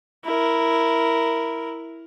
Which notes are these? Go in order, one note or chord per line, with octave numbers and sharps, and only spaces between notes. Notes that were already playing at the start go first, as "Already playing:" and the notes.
E4 A#4